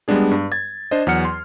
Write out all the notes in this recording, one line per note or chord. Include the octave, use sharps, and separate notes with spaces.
G3 G#3 B3 D4 G#4
G2
G#6 A6
D4 C5 D#5
E2 F#3 F#5 F6 C#7
C6